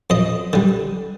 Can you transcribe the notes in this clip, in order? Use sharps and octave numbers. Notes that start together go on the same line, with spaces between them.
F2 D#5
D3 G3